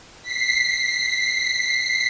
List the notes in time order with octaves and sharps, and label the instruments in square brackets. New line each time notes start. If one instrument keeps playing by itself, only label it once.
[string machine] B6 C7